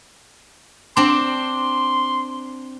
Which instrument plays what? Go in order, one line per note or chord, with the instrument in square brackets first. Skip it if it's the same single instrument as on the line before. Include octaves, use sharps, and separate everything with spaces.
[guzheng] C4 D4 [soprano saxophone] C6